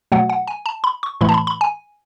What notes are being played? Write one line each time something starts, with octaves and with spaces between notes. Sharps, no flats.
B2 F#3 A3 F#5
F#5
G#5
A5
B5
C#6
A2 E3 A3 B5
A5
B5
B5
G#5